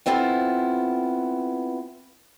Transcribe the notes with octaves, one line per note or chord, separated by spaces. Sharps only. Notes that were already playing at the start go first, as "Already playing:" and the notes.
B3 C4 E4 F4 A4